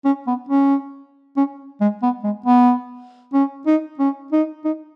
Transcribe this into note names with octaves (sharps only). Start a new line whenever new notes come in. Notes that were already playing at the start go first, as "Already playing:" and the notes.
C#4
B3
C#4
C#4
G#3
B3
G#3
B3
C#4
D#4
C#4
D#4
D#4